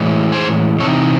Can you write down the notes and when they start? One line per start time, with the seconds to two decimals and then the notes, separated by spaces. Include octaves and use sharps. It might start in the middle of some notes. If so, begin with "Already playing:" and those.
Already playing: A2 E3 G#3
0.32 G#4 C5
0.80 C3 E3 C4 D#4 A4 C#5